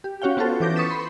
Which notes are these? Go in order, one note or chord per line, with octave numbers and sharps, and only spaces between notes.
G4
C#4 F#4 C#5 F5 G5
B3 C#4 F4 F#4 A4 C5
E3 B4 D6 G6 A#6
C#6 D#6 A6 B6 E7
B5 C6